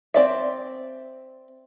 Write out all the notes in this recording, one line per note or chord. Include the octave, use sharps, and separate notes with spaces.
C4 D5 E5